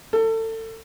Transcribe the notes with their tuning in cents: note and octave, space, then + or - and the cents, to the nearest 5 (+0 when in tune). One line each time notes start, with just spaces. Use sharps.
A4 +30